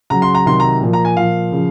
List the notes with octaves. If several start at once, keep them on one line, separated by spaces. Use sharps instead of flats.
C#3 F#3 A#5
C6
A#5
C3 D#3 F#3 C6
A#5
A#2 F3
A#5
G#5
A#2 F3 F5
C#3 F3